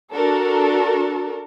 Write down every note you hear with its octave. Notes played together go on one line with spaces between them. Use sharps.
D4 F#4 A4 A#4